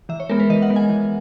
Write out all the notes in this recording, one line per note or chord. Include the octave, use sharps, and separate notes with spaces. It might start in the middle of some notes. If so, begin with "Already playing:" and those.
E3 E5
C#5
G#3 B3 A#4
B4
E3 D#5
F#5
G#3 B3
G#5
E3